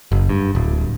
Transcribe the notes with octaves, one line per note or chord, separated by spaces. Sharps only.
F#1
G2
D1